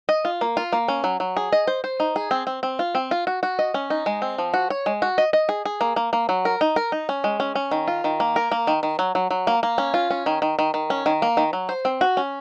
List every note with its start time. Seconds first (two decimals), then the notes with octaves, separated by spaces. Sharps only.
0.09 D#5
0.25 F4
0.41 A#3
0.57 F4
0.73 A#3
0.88 C#4
1.04 F#3
1.20 F#3
1.37 G#4
1.52 D#5
1.67 C5
1.84 C5
2.00 D#4
2.16 G#4
2.31 C4
2.47 C4
2.63 C4
2.79 F4
2.95 C4
3.11 F4
3.27 F#4
3.43 F#4
3.59 D#5
3.74 C#4
3.90 D#4
4.06 G#3
4.22 C4
4.38 F3
4.54 F#4
4.70 C#5
4.86 G#3
5.02 F#4
5.18 D#5
5.33 D#5
5.49 G#4
5.65 G#4
5.81 A#3
5.96 A#3
6.13 A#3
6.29 F#3
6.45 A#4
6.61 D#4
6.76 A#4
6.92 D#4
7.09 C#4
7.24 G#3
7.40 C#4
7.55 C#4
7.71 D#3
7.88 F4
8.04 D#3
8.20 A#3
8.36 A#4
8.51 A#3
8.67 D#3
8.83 D#3
8.99 F#3
9.15 F#3
9.30 F#3
9.47 A#3
9.63 A#3
9.78 C#4
9.94 F4
10.10 C#4
10.26 D#3
10.42 D#3
10.59 D#3
10.74 D#3
10.90 C#4
11.06 D#3
11.22 A#3
11.37 D#3
11.53 F#3
11.69 C5
11.85 C4
12.01 F#4
12.17 C#4